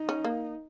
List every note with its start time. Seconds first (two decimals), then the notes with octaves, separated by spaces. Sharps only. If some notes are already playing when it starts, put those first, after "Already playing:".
Already playing: D#4
0.09 C#4
0.24 A#3